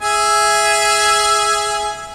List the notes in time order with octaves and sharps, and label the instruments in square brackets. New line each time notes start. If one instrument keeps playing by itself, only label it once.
[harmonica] G#4 E5 G#5